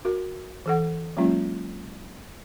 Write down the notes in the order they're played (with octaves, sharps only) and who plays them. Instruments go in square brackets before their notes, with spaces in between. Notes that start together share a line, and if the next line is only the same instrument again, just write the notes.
[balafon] F#4 A#4
E3 A4 F#5
F#3 G#3 A#3 C#4 F4